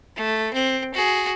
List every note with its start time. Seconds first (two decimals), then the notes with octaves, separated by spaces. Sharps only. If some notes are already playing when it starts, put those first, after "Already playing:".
0.16 A3
0.53 C4
0.94 F#4 G#4